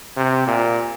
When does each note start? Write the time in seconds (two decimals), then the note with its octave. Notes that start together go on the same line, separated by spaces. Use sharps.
0.17 C3
0.47 A#2